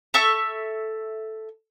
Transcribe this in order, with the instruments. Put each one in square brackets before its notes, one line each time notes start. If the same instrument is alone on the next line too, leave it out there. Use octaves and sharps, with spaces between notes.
[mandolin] A4 E5 C#6 E6